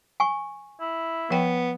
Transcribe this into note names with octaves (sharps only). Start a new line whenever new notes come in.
G#5 C#6
E4
F3 B3 G5